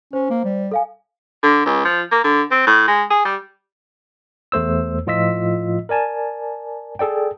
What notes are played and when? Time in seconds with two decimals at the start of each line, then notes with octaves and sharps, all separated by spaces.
0.13 C#4 C5
0.30 A#3
0.45 G3
0.71 A4 F5 G#5
1.43 D3
1.65 C#2
1.84 F3
2.11 A#3
2.24 D3
2.51 C4
2.67 A2
2.88 G#3
3.10 G#4
3.25 G3
4.52 E2 A3 C5 E6
5.07 A2 F3 F4 D#5 E6 B6
5.89 A#4 D5 G#5 A5
6.99 G#4 A4 D5 G5